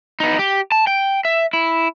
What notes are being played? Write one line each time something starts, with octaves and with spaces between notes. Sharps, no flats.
B3 D#4
G4
A5
G5
E5
E4